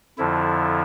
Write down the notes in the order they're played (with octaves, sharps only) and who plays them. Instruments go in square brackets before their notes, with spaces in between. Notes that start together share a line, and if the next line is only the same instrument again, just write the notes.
[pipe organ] F2 D3 F3 E4